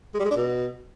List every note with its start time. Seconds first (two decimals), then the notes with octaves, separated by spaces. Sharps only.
0.14 G#3
0.20 G3
0.25 G#3
0.31 D4
0.36 B2